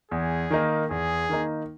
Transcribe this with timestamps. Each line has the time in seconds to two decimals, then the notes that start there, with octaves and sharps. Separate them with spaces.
0.11 E2 G#4
0.51 D#3 A#3 D#4
0.90 E2 G#4
1.29 D#3 A#3 D#4